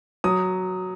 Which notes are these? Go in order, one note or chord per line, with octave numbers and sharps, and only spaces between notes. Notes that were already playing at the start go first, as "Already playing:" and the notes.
F#3 D#6